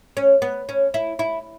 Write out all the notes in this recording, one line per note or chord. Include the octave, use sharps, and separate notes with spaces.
C#4
B3
C#4
E4
E4